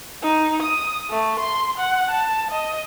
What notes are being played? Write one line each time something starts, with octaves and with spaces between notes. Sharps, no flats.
D#4
D#6
A3
C6
F#5
A5
D#5